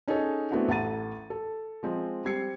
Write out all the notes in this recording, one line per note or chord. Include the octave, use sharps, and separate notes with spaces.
C#4 D#4 G#4 A4 C#5
A3 B3 C4 D4 E4 F#4
A1 A4 F#5 A#5 A6 D#7
A4
F3 G#3 C4
G3 C4 G#6 C7 C#7